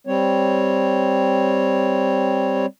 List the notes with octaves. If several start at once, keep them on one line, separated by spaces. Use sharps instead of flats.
G3 C4 C#5